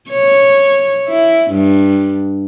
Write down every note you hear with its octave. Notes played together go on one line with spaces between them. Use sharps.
C#5
E4
G2